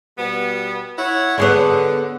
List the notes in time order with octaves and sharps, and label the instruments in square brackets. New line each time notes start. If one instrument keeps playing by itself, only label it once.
[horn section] B2 G3 B3
E4 C#5 F#5
[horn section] D3 [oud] B3 G#4 C#5